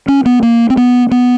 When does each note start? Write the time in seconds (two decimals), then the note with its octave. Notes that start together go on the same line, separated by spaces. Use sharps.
0.08 C#4
0.26 B3
0.43 A#3
0.70 C4
0.77 B3
1.11 B3